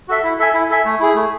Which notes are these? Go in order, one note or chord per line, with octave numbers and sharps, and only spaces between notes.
F#4 A4 E5
E4
A4 E5 G#5
E4
A4 E5 G#5
A3
E4 G#4
A3